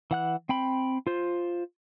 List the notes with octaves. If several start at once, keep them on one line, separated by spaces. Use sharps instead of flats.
E3 F#5 F#6
C4 G5 B5
F4 C5